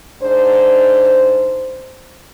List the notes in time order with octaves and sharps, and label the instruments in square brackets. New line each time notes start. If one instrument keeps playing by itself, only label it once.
[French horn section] G#2 D4 C5